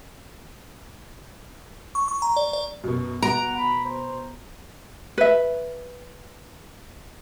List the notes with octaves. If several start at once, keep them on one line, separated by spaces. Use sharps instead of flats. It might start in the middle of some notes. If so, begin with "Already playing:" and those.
C#6
C#6
A#5
D5
D5
F#2 B2
B2 F#5 A#5 D7
B5
C5
B4 E5